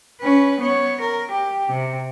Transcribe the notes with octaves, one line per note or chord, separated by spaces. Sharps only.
C#4 B4
B3 C#5
A#4
G4
C3